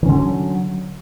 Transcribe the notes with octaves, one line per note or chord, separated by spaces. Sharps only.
D3 D#3 F#3 C#4